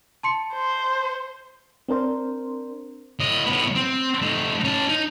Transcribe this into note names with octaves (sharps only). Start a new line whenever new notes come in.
A5 C6 C#7
C5
C4 D4 A#4 C5
A2 D#5
A2 B3
C4
A3 D#4
C#4 A5
D#4